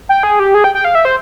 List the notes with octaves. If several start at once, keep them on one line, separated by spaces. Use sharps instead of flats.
G5
G#4
G4
G#4
G5
G5
F5
E5
C5